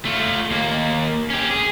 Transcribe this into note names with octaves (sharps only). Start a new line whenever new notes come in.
A3 F4
D#2 A#3
C#4 G4
G#4